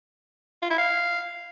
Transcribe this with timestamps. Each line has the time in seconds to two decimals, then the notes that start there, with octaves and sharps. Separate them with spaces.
0.62 F4
0.70 E4
0.78 F5